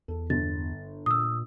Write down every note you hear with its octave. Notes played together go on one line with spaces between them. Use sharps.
E2 A4
G1 A6
A#2 D#6 E6